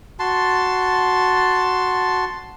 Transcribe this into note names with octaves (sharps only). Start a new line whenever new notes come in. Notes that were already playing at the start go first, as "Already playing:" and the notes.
F#4 A5 C6